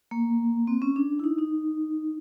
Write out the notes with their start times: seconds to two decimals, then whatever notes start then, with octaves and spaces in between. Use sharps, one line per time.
0.11 A#3
0.67 C4
0.82 C#4
0.96 D4
1.19 E4
1.24 D#4
1.38 D#4